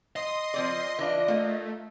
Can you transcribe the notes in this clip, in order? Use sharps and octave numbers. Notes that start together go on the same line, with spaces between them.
D#5 C6 D#6
F3 C4 D5
E3 D4 F4
A3 A#3 F4